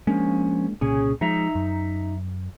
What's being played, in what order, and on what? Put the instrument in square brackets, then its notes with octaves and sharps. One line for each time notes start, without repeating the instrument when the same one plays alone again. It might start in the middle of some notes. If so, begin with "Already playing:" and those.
[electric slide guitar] F3 C#4 [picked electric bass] G#3 A#3 D4
[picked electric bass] C2 A#2 C#3 [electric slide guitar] C#4 G#4
[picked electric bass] F3 G#3 [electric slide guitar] D#4 E5 A#5
[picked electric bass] F#2